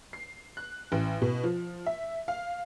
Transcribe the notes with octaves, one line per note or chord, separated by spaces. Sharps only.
C7
F#6
A1
B2
F3
E5
F5